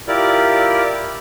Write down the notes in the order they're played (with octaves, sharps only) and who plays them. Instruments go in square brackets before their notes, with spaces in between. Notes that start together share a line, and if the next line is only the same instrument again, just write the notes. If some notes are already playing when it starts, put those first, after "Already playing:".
[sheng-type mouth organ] E4 F4 G4 A#4 D5